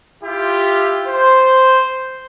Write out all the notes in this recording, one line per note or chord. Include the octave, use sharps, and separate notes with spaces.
E4 F4 G4
C5